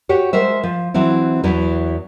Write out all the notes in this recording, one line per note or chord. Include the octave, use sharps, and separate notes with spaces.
F#4 G4 C#5
G#3 A#4 C5 E5
F3
E3 F#3 C4 E4
E2 E3 F#3 E4